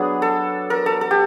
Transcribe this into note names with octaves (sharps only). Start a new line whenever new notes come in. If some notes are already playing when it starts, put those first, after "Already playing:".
Already playing: F#3 B3 D4 G#4
A4
A#4
A4
A4
G4